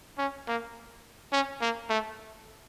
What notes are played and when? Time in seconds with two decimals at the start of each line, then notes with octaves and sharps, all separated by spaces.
0.18 C#4
0.48 A#3
1.32 C#4
1.61 A#3
1.89 A3